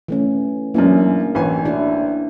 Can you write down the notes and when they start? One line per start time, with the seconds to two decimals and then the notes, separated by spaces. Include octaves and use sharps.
0.08 E3 A3 C#4
0.74 F#2 E3 A#3 C#4 D4
1.35 A1 C#5 G#5
1.65 D4 E4 F#4